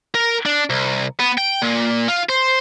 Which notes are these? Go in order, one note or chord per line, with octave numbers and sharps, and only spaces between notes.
A#4
D4
C2
B3
G5
A#2
F4
C5